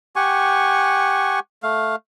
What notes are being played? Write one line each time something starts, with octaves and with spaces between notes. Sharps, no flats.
G4 F#5 G#5 C#6
A3 F5